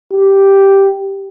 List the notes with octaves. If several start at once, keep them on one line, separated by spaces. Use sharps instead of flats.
G4